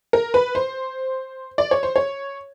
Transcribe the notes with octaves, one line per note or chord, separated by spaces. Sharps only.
A#4
B4
C5
D5
C#5
C5
C#5